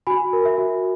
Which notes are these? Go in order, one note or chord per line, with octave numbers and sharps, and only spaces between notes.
F#4 G#5 B5
A#4
E5
F#4